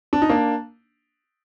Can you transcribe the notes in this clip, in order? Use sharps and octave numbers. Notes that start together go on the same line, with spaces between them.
D4
D#4
A#3 D4